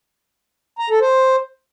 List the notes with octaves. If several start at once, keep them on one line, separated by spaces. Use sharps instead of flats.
A#5
A4
C5